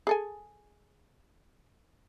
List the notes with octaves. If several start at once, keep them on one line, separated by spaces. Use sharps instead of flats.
G#4 A4 G#5